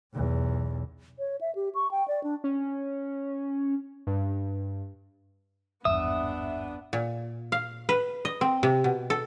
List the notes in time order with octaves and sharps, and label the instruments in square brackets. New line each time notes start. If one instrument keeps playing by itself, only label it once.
[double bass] B1 E2
[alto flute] C#5
E5
G4
C#6
G5
D5
D4
[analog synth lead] C#4
[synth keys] G2
[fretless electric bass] G#1 E2 G2 [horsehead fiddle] B3 D4 [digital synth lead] E5 [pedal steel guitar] D#6
[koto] A#2
F5
B4
D#5
C4
C3
B2
A4